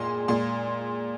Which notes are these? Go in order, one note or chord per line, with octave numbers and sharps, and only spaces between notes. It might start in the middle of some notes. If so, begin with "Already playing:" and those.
Already playing: A#2 G#3 C6
A#2 G#3 C6